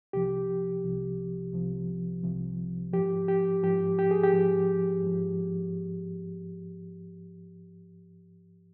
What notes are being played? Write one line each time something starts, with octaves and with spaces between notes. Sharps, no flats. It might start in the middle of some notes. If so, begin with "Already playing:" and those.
C2 C3 F3 G4
C2 C3 F3
C2 C3 F3
C2 C3 F3
G#2 F3 G4
G4
G#2 F3 G4
G4
G#4
G4
G#2 F3
G#2 F3